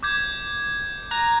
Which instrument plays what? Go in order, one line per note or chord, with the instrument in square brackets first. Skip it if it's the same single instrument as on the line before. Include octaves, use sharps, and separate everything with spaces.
[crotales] D6 G6 G#6
[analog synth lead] A#5 [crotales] F#6